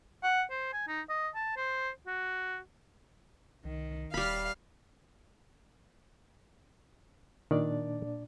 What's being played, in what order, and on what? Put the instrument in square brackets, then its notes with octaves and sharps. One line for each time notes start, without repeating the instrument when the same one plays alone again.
[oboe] F#5
C5
G#5
D#4
D#5
A5
C5
F#4
[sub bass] C2 [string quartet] D#3
[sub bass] D#1 [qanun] G3 B5 [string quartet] F5 F6
[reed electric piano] A#2 D4 D5 [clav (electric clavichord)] D#3